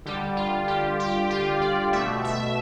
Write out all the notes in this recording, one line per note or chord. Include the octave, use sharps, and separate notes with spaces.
D3 G3 G4
F4
G4
G4
F4
D5
B2 A3 E5
E5